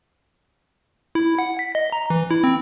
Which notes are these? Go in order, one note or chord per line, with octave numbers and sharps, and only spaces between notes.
E4
F#5
B6
D#5
A#5
E3
E4
C4